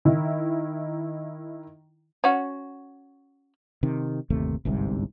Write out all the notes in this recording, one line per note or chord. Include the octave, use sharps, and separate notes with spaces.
D#3 D#4 E4
C#4 F#4
C3 D#3
G1 D#2 C3 A3
G1 C2 G#2 C3